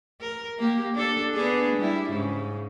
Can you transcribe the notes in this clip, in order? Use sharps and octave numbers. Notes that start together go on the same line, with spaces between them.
A#4
A#3 G4
D4 A4
B3 D4 G#4
G3 E4
G#2 C#3